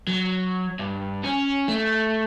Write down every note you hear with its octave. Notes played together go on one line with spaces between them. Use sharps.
F#3
G2
C#4
A3